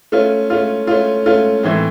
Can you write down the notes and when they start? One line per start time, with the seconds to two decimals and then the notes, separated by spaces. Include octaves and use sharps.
0.12 A3 C#4 F4
0.50 A3 C#4 F4
0.87 A3 C#4 F4
1.26 A3 C#4 F4
1.63 A2 E3 A3 C4